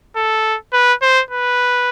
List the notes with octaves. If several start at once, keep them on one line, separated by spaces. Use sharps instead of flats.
A4
B4
C5
B4